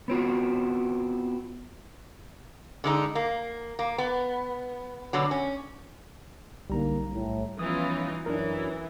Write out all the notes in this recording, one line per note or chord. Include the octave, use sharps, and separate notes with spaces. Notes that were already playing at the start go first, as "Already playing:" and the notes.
B3 C4 F4 F#4
D3 G#3 D#4
A#3
A#3
B3
B2 D3 F#3
C#4
B1 D3 G3 A#3 D#4 A#5
A2
E3 F3 B3 C#4 D#4 F4 D#6
F#2 E3 D4 A#4